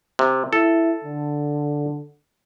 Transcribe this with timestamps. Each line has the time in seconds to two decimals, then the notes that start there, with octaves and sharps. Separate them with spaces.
0.19 C3
0.53 E4 A4
1.04 D3